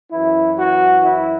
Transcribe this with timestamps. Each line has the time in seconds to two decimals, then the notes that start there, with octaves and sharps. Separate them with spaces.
0.11 F#2 E3 E4
0.57 F#4
1.03 E4